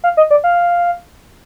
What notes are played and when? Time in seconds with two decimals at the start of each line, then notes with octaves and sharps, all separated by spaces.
0.04 F5
0.17 D#5
0.31 D5
0.44 F5